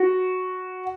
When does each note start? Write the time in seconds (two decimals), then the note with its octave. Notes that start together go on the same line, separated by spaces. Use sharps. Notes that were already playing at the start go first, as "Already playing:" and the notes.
Already playing: F#4